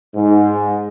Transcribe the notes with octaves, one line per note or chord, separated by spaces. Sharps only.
G#2